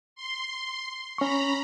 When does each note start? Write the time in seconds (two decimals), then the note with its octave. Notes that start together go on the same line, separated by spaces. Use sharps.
0.16 C6
1.18 C#4 A#5 B5 C#6